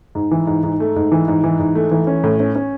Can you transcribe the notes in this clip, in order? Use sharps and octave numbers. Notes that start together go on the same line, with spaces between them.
G#2
E3
G#2
G#2
A3
G#2
E3
G#2
E3
G#2
A3
E3
C#4
A2
C#4
C#4